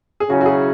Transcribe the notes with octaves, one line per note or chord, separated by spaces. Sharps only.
G#4
C#3 F#3 C#4 E4 F#4
F#4
G#4